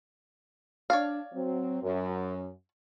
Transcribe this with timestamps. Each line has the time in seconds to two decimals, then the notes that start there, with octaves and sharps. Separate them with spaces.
0.90 D4 C#5 D5 F5
1.32 F#3 C4
1.82 F#2